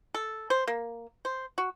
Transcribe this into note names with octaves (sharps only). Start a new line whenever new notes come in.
A4
C5
A#3
C5
F#4